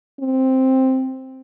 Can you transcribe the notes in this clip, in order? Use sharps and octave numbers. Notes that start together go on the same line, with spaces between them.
C4